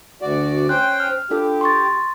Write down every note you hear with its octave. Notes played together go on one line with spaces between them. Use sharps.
D2 F#4 D5
C#4 C5 G5 F#6
F6
D4 F4 G4 A4
C6 C#6 A6